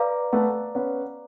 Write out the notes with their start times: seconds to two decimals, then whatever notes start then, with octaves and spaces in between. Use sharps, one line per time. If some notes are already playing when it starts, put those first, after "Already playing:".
Already playing: B4 D5 F5 A#5 D6
0.33 A3 B3
0.75 B3 C#4